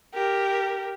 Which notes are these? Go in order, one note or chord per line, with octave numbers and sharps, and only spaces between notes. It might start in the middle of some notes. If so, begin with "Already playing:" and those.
G4 A#4